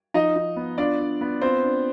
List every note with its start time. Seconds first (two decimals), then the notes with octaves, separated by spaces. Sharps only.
0.14 F3 D#4 D#5
0.36 D#4
0.56 B3
0.78 D4 F4 D5
1.00 D4
1.21 B3
1.42 C4 F4 C5
1.63 D4